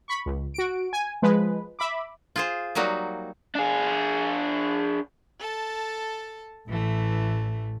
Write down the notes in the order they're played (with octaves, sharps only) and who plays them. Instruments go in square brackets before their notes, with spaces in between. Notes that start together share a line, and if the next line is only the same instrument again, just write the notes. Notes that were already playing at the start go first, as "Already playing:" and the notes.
[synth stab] B5 C#6
C#2
F#4 D7
G#5
F3 G#3 B4
E5 B5 D6
[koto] F4 G#4 C5
F#3 G3 A#3 D#4 F#4
[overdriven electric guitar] D4 G#4
[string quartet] A4 A5
[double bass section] A1 [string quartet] E3 A3